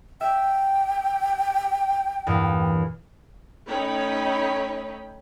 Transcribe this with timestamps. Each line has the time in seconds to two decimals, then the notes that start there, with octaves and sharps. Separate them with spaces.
0.21 E5 G5
2.27 E2 G2 A#2
3.67 A3 C#4 D#4 C#5 G5 B5